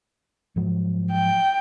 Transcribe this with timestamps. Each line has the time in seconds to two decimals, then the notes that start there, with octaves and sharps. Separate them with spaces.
0.56 G#2 F3 F#3
1.12 G5